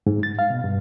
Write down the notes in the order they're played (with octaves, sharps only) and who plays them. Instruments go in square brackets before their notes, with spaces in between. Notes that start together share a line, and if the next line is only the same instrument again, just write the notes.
[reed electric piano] G#2
A6
F5
B2
G2